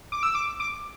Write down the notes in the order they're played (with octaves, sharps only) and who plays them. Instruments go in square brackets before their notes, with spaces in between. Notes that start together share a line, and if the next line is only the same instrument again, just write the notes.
[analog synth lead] D6
E6
D6
D6